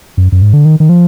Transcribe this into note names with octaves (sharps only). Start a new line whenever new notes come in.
F#2
F#2
G#2
D3
D#3
D#3
F3